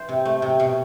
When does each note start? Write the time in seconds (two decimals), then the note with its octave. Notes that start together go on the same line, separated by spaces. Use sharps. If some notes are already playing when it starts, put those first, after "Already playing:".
Already playing: E3 C5
0.09 C3
0.25 A3
0.42 C3
0.60 B2